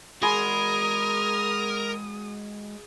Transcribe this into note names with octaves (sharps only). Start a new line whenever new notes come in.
G#3 F#4 G#4 A#4 B5 C6 D#6